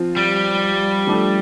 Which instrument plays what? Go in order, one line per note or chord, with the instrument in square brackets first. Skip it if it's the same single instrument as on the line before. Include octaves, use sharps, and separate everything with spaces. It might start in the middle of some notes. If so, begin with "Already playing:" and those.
Already playing: [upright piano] F3 C4 F4
[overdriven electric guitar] G3
[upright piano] F3 A3 D4 A4